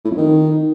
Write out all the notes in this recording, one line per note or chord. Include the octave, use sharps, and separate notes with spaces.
A2
F2
D#3